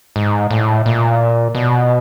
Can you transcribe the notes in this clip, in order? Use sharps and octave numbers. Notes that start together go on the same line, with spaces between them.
G#2
A2
A#2
B2